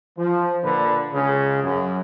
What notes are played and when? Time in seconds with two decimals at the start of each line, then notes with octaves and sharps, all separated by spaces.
0.18 F3
0.64 A#2 D3 B4
1.12 C#2 C#3 G#4
1.64 F#2